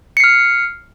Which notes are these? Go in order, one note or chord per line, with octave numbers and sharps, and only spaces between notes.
F6 C7 C#7